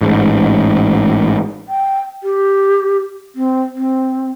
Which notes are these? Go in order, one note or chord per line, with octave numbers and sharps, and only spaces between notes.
A1 G#2
G5
G4
C4
C4